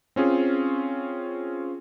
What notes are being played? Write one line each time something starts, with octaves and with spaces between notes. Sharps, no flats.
C4 C#4 F4 G#4